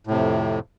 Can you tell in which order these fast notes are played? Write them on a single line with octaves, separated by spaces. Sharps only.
A2 C3 F2